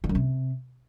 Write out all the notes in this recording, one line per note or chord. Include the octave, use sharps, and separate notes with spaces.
D3
F#2
C3